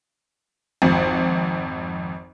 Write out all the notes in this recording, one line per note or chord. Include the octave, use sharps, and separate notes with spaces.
G#1 F2